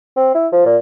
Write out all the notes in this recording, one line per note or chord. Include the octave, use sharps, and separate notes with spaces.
C4
E4
F3
A#2